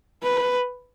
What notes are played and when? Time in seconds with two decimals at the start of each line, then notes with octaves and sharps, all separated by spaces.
0.23 B4